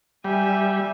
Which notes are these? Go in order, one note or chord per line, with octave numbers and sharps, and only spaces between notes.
G3 E5 G#5